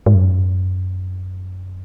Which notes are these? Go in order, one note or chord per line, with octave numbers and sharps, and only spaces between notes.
G#2
F#2